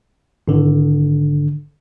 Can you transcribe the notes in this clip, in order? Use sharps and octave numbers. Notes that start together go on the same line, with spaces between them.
G#1 D3